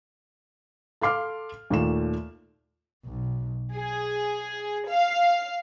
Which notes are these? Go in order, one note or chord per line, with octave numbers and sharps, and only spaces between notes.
A4 F5 C6 D6 F6
D#2 A#2 A3 F4 E7
B1
G#4
F5